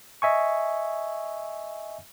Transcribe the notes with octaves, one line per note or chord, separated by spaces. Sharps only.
D#5 E5 G#5 C#6